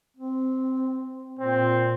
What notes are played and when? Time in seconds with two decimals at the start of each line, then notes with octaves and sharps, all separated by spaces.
0.17 C4
1.39 A#2 C4